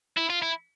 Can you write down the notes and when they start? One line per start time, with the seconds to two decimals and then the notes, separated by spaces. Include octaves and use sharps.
0.17 E4
0.30 F4
0.42 E4